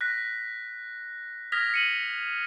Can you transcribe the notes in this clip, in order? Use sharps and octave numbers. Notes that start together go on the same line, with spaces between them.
F#6 A#6 B6
D#6 F6 G#6 A#6 B6 F7
C#7 D#7 F#7